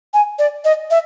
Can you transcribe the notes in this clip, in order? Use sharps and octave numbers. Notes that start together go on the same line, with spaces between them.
G#5
D5
D#5
E5